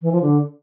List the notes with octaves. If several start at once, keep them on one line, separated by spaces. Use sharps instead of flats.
E3
F3
D3